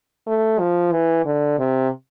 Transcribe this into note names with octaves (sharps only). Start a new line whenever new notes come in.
A3
F3
E3
D3
C3